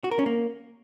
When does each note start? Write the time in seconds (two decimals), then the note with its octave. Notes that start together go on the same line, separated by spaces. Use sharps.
0.04 F#4
0.11 A#4
0.19 C#4
0.26 A#3